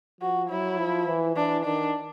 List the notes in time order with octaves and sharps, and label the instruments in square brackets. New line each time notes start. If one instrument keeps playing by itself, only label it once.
[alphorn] F3 [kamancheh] F#4
[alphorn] F#3 [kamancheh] E4
[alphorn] F3
E3
[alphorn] E3 [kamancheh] D4
[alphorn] D#3 [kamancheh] D4